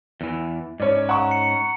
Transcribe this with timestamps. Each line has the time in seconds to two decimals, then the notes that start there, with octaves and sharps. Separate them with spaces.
0.21 E2 E3
0.80 G#2 C#4 C#5 D5
1.09 F#5 A#5 C#6
1.31 C#7